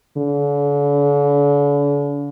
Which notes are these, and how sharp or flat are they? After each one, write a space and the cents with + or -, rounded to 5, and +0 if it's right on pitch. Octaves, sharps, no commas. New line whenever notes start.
D3 -45